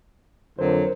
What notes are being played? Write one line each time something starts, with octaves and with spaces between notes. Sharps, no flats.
F2 D3 F#3 A#4 C5